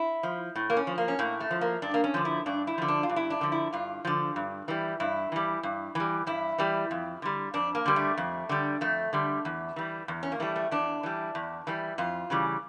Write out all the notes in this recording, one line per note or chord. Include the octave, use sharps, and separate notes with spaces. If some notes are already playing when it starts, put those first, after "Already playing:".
Already playing: E4
F3
A2
A#3
C#4
F3
A#3
C#4
A2 A#3
A3
F3
A#3
G2 D4
A#3
C#4
D3 F3
E4
G2 D4
E4
D3 F3
D4
F4
G2
E4
D4
D3 F3
E4
G2 F4
D3 F3
G2
E3 G3
G2 E4
E3 G3
G2
E3 G3
G2 E4
E3 G3
F2
D3 G3
F2 D4
A#3
D3 G3
A3
F2
D3 G3
F2 A3
D3 G3
E2
E3 G3
E2
C#4
A#3
E3 G3 A3
A3
E2 D4
E3 G3
E2
E3 G3
F2 F4
C#3 E3 G3